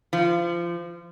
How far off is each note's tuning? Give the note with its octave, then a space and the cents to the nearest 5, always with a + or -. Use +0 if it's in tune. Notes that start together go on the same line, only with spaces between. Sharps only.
F3 -25